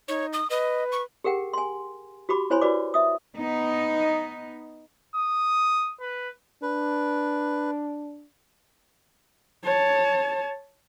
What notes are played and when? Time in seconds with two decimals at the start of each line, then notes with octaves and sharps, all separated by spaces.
0.08 D#4 C#5
0.33 D#6
0.50 B4 D#5
0.92 C#6
1.24 G4 G#4 A#4 F#5 G5
1.53 G#5 C6
2.29 F#4 G4 B5 D6
2.50 E4 C5 C#5 G#5 B5 C6
2.62 F#4 B4 D5 D6
2.94 E5 D#6
3.36 B3 D#4
5.15 D#6
6.00 B4
6.62 D4 B4
9.64 C#5 A5